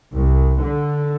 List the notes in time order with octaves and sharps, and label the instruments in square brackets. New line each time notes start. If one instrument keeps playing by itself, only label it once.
[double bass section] C2
D3